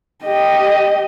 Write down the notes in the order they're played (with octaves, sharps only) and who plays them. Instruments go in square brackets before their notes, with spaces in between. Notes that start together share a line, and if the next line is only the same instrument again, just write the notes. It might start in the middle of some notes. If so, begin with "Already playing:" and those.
[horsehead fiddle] G4 D#5